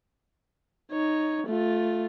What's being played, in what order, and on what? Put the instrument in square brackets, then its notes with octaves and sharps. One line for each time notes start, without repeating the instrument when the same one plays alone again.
[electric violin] D#4 C#5
A3 F4